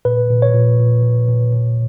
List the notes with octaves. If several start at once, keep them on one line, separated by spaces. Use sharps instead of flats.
A#2 B4
A#2
C#5
A#2
A#2
A#2
A#2
A#2